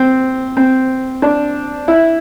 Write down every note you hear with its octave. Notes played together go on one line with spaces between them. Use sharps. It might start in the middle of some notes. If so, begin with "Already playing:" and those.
Already playing: C4
C4
D4
E4